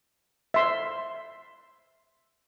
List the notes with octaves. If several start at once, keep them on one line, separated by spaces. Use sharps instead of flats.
E5 C6